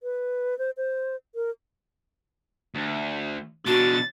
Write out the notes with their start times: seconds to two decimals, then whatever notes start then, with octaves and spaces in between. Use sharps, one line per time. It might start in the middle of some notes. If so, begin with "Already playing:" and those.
0.03 B4
0.58 C5
0.77 C5
1.35 A#4
2.75 D2
3.67 B2 D4 F#4 A6